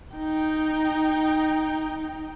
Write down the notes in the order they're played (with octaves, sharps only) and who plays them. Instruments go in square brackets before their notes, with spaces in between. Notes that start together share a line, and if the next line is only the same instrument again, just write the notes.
[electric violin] D#4 G5